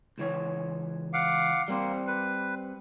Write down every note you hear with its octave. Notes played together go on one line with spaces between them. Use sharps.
C#2 E3 C#5
F5 F#5 D6
G3 A#3 C4 C5
B4